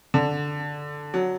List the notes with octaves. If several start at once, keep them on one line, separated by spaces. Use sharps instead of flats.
D3
F#3